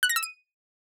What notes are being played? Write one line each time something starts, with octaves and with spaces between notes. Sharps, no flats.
F#6
A#6
E6
D#7